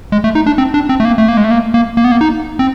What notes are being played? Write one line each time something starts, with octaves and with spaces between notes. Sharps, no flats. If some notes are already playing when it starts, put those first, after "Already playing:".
G#3
A3
D#4
D4
C4
D4
C4
A3
A#3
A3
A#3
G#3
A3
A#3
A#3
A#3
B3
A#3
D#4
C4